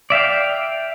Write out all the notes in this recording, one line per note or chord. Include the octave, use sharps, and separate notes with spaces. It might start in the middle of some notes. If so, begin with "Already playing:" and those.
D5 E5 F5 G5